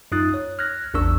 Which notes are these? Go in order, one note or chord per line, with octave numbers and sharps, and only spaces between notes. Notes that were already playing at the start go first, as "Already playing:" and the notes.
F#2 D#4 F4 D#6 F#6 A6
C#5
F6 F#6 G#6 A#6
A1 E2 D4 A#4 C#6 E6